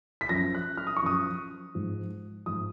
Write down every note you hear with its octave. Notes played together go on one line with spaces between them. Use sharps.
B6
F#2 F3 A#6
F#6
F6
D#6
C#6
F#2 F3 D#6
G#2 F3
G#2 F3 D#6